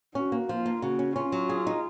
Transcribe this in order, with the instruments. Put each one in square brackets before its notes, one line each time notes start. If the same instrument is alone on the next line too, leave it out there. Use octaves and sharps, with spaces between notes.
[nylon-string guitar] C#4 [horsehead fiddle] F#4
[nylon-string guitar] A#3
[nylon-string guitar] F3 [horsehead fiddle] F4
[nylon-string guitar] A#3
[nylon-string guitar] C#3 [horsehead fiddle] F#4
[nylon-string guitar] C#4
[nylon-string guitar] C#4 [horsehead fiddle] F4
[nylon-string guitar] F#3
G#4
D#4